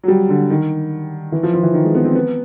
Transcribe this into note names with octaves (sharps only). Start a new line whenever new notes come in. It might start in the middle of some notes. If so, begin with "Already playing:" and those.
F#3
G3
D3
D#3
E3
F3
F3
E3
D#3
G#3
B3
C4
B3